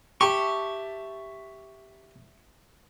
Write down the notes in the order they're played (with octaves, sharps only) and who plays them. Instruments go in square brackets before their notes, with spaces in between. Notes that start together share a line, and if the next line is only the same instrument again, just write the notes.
[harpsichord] G4 [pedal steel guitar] E5 A5 C#6